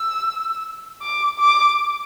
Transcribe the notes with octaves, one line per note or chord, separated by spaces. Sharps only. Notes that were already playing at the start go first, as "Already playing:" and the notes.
Already playing: E6
D6
D6